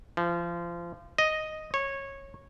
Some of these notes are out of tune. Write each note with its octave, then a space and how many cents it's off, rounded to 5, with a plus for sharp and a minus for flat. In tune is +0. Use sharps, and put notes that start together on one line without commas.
F3 -25
D#5 +0
C#5 -15